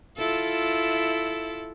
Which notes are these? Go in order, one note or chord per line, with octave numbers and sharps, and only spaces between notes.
E4 F4 A4